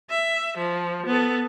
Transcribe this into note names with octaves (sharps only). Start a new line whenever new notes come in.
E5
F3
B3 A4